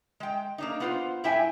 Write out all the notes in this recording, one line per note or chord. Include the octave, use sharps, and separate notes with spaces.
G#3 G5
A#3 D4 D#4
B3 F4 C5
G2 E4 E5 G5 G#5